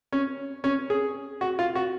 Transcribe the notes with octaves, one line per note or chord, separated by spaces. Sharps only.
C#4
C#4
G#4
F#4
F4
F#4